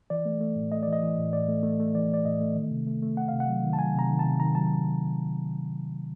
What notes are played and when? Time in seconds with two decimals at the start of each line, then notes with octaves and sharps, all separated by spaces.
0.10 E3 D5
0.25 A3
0.41 A3
0.56 A2
0.71 A3 D#5
0.83 E3 D5
0.93 D#5
1.02 E3
1.18 A2
1.33 A2 D5
1.49 A3
1.63 A3
1.80 A3
1.95 E3 D5
2.10 A3 D5
2.25 A2 D#5
2.41 A3
2.55 D#3
2.71 C3
2.87 A3
3.02 A3
3.17 A3 F#5
3.28 C3 F5
3.40 F#5
3.48 F#3
3.63 D#3
3.73 A5
3.79 F#3 G#5
3.95 C3 A#5
4.10 D#3
4.19 A5
4.25 C3
4.40 D#3 A#5
4.55 F#3 A5